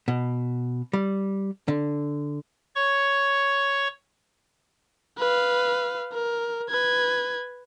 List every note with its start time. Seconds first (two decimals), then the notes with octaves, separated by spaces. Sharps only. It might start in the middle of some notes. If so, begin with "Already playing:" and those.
0.08 B2
0.93 G3
1.68 D3
2.76 C#5 C#6
5.18 B4 F5
6.12 A#4
6.70 B4 G#6